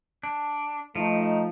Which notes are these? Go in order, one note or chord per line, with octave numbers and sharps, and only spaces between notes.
D4
F3 A3 D#4